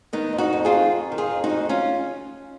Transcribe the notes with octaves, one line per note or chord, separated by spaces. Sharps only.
D#3 B3 D#4
F2
D#4 F#4
F2
F4 G#4
D#3
F2
D#3
F4 G#4
F2
D#4 F#4
F2
C#4 F4